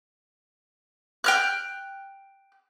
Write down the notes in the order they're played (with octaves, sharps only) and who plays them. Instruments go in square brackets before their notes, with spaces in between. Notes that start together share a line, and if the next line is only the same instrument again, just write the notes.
[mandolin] G5 F6 F#6